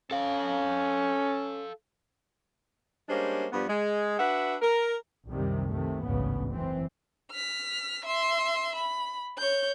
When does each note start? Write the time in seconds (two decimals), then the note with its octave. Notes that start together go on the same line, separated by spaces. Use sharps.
0.11 C#4 A4 F5
3.09 G3 G#3 A#3 C#4 D4 C5
3.52 G2 F3 G3 B3
3.69 G#3
4.19 D4 F#4 B4 E5 F#5
4.62 A#4
5.29 C2 F#2 C3 D#3 G3
5.69 C3 D#3 A3
6.03 A1 D2 G#2 C#3 B3
6.51 F#1 E3 C4
7.31 F6 B6
8.05 E5 C6
8.75 B5
9.38 C#5 G6